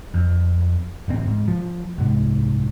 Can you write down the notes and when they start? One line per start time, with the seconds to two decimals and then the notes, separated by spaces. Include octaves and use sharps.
0.14 F2
1.08 D1 A1 C4
1.25 G#2
1.48 F3
1.98 C2 G#2